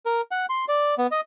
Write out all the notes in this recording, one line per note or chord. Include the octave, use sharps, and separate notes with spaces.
A#4
F#5
C6
D5
B3
D#5